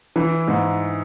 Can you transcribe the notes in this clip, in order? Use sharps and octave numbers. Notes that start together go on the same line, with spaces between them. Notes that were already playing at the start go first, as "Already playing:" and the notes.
E3
G#2